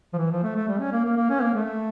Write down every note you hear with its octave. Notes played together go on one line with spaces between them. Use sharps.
F3
E3
F3
A3
A3
G3
C#4
A#3
A#3
A#3
C#4
A#3
A3